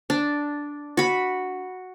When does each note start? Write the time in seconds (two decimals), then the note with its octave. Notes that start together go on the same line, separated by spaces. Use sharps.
0.10 D4
0.97 F#4 B5